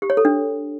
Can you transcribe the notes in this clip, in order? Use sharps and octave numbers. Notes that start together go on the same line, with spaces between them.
G4
C#5
A4
D4